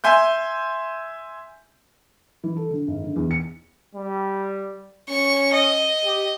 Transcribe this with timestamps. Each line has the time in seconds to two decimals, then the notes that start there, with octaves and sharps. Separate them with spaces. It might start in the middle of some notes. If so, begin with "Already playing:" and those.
0.04 E5 G#5 C6 G6
2.44 E3
2.57 A4
2.71 D3
2.88 G#1
3.04 D3
3.16 E2
3.31 C#7
3.95 G3
5.09 C#4 C#6
5.53 D#5
6.05 G4